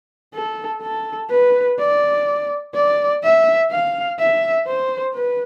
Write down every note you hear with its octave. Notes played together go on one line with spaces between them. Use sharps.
A4
A4
B4
D5
D5
E5
F5
E5
C5
B4